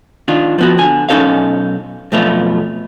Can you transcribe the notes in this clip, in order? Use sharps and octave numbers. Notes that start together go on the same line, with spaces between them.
D#3 D4 F4
F3 B3 F#4
D3 G#5
B1 C#4 D#4 A4 C#5 F5
B1 F2 A3 B3 F4 C#5